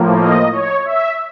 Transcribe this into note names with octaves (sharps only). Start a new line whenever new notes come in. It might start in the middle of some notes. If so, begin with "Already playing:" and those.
Already playing: A2 F3 A#3
D#5
C#5
E5